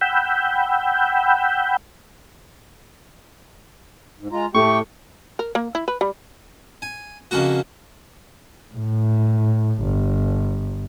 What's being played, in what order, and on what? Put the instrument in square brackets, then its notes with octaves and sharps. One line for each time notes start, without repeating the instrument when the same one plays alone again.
[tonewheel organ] F#5 G5 B5 E6 G6
[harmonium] G#2
G#3 F4 A#5
[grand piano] A2 [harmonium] A3 G4 G5 [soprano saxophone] C#6
[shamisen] A#4
A#3
E4
B4
G3
[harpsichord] G#5
F2 C#3 A#3 F#4
[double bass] A2
G1